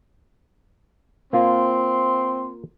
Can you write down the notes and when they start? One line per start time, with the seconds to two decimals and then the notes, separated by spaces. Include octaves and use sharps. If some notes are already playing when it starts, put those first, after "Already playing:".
1.33 A#3 C4 F4 F5 C6